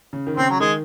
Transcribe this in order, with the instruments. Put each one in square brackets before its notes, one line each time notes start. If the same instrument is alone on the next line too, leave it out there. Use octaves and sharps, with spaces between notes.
[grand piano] C#3
D#3
[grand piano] C#3 [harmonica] C4
[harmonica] F#3
[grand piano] D#3 [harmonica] G#3